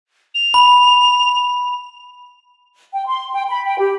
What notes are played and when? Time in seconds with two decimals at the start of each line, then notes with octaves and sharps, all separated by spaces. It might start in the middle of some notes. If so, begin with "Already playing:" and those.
0.35 F7
0.54 B5
2.93 G5
3.07 C6
3.34 G5
3.49 B5
3.65 G5
3.79 G4